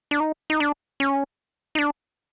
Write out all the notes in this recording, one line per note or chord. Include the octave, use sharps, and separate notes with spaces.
D4
D#4
D#4
D4
C#4
D#4
D4